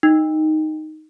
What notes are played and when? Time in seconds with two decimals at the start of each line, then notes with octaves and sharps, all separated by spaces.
0.03 D#4